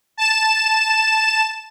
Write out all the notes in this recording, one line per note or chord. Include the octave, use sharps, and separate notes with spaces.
A5 E7